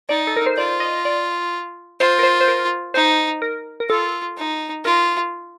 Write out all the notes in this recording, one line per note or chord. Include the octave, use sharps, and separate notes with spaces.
D#4 D5
A4
A#4
C5
F4 D5
D#5
D5
F4 C5
A#4
C5
C5
A#4
D#4 C5
A#4
A#4
F4 A4
D#4
F4 A#4